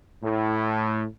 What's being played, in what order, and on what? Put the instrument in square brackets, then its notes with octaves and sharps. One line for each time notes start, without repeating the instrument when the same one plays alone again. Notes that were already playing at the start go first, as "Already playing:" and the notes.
[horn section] A2